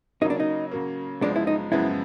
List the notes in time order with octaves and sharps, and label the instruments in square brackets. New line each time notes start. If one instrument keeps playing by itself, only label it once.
[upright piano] C#3 F#3 A#3 [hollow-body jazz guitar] D#4
[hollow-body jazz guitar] D4
D#4
[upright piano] C#3 F#3 A#3
[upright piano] F#2 C#3 F3 G#3 B3 [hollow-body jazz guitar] D4
[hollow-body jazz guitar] E4
D#4
[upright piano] F#2 C#3 F3 G#3 B3 [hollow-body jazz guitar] E4